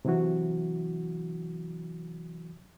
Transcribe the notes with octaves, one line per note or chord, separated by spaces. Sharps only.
C3 E3 F#3 E4 F#4